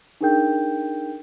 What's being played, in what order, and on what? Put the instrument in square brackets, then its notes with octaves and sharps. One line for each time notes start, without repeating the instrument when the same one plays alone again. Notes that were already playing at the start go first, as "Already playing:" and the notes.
[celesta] D4 D#4 G#4 A#4 G5 G6